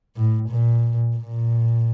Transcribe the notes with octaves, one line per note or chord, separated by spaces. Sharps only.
A2
A#2
A#2